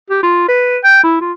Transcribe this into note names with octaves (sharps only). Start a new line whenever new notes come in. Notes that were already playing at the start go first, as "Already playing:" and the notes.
G4
F4
B4
G5
E4
F4